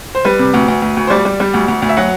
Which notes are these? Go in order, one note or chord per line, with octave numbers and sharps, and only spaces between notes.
C5
G3 B4
C3
D2
D2
D2
D2
C5
G3 D5
G3
G3
D2
D2
D2
E5
F#3 F#5